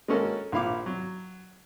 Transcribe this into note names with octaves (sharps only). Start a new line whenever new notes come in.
G#3 A#3 C#4 F#4 A4 A#4
A#1 E4 F5 D6
F#3